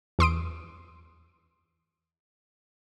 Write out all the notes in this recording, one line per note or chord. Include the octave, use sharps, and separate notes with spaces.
E2 C6 D#6 D7